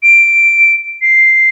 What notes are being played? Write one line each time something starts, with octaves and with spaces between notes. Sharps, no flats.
D7
C7